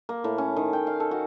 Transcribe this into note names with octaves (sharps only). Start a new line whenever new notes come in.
A#3
A2
C#4
D#3
G5
F5
A4
F#4